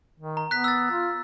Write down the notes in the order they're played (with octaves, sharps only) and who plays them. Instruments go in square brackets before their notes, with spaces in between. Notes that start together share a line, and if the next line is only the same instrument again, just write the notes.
[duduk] D#3
[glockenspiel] A#5
[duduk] B3 [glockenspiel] F#6 B6
[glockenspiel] E6 A6
[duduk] F4